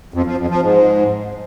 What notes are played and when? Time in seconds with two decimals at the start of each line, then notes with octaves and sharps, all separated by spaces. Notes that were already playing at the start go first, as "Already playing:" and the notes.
0.14 F2
0.26 F3
0.38 F2
0.50 F3
0.62 G#2